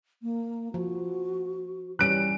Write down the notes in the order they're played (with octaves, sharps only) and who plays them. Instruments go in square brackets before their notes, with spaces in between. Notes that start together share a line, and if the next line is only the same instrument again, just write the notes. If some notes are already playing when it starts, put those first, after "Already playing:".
[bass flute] A#3
[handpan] F3 [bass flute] F#4
[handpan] E3 G3 C#4 [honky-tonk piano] F#6 D7